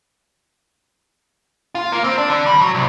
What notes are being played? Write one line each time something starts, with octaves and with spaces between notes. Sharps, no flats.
F4
A#3
C4
D4
D3
G3
F#3
C2